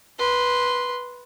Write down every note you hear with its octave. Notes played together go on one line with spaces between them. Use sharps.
B4 C6